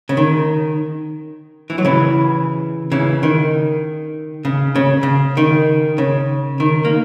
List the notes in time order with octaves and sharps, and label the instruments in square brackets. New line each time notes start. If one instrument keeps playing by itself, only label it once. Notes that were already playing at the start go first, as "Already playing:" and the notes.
[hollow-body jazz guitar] C#3
D#3
E3
F#3
C#3 E3
C#3 E3
D#3
C#3
C#3
C#3
D#3
C#3
D#3
A#3